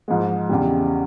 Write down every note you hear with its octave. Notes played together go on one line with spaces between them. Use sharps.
G#2 F3 G#3
E2 C#3 G3